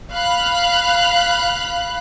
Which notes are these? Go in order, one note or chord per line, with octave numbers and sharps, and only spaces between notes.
F5 B5 F#6